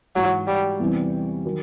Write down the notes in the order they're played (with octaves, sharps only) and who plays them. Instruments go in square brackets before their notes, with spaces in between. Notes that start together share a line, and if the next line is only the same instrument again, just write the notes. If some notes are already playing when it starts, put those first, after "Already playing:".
[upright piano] G#2 E3 G#3 [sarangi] F#3
[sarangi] G3
[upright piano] E2 C3 E3 G3 C4
D#3 F#3